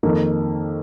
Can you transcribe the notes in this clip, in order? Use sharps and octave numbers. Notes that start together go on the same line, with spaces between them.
F2 D#3 A#3